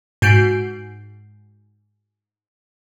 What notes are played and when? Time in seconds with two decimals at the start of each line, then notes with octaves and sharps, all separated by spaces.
0.22 G#2 F#4 G6 C7 D7